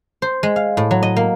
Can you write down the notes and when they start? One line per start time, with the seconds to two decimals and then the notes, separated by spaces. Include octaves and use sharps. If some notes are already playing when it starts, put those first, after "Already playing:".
0.22 C5
0.43 G#3
0.56 F5
0.77 A2
0.91 F#3
1.03 D#5
1.17 A#3